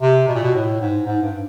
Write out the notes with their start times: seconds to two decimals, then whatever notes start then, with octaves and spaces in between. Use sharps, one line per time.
0.01 C3
0.28 B2
0.35 A#2
0.43 B2
0.55 A2
0.81 G#2
1.07 G#2
1.23 G2